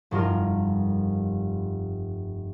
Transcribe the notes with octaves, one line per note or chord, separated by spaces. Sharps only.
F1 G2 F4 A#4